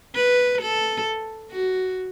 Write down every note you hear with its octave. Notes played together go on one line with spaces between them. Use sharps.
B4
A4
F#4